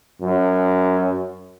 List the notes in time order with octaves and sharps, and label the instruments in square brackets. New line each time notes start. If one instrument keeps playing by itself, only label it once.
[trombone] F#2